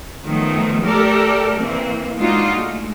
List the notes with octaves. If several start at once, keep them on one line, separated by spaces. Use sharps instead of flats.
D#3 F3 F#3 A3 B3
A3 G4 A4 A#4 D5
E3 A#3 C4
G#3 A#3 D4 D#4 F4 F#4
G#3 A3